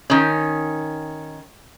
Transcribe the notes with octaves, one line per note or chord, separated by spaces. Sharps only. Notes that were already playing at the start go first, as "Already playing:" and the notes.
D#3 C#4